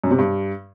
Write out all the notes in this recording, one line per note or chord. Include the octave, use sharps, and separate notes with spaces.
F#2
C3
G2